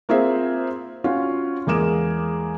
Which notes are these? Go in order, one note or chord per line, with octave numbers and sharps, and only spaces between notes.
A#3 C4 F4 G#4 C5 E5
C#4 F4 F#4
E2 G#3 A#3 G#4 D6 E7